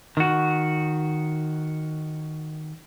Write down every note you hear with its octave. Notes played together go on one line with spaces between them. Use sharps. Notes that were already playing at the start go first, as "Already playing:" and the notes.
D#3 F#4